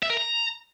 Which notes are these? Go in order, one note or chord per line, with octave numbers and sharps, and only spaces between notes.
E5
A#4
A#5